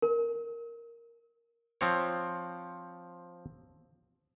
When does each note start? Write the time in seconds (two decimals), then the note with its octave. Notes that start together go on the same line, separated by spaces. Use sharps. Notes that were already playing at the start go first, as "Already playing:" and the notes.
0.02 A#4
1.81 F3 C4 C#5